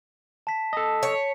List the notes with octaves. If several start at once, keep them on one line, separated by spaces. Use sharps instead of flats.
A5 B6
A4 D#5
C#5